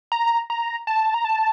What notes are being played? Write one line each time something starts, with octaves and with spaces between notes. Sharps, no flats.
A#5
A#5
A5
A#5
A5